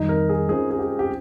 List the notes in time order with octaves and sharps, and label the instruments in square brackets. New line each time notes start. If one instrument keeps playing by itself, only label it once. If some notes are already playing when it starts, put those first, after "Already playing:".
Already playing: [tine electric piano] F2 D#3 G3 [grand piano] D#4
[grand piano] A#4
G#4
[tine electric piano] G#3 C#4 F4 C5 [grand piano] G#4
[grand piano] G#4
G4
G4